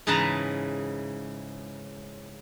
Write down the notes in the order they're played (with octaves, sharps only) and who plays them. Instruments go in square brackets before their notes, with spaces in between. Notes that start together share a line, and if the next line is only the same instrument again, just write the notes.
[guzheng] G#2 C#3 E3 B4 A5 A#5